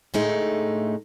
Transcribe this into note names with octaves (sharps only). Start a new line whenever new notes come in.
A2 D3 G#3 A3 D#4